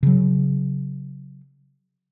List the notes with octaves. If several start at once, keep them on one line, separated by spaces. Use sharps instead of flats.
C#3 F#3